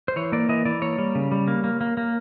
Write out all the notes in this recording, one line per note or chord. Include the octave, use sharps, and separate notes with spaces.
C5
E3 C#5
A#3 D5
E3 D#5
E3 D5
A#3 C#5
G3
C#3
G3
A#3
A#3
A#3
A#3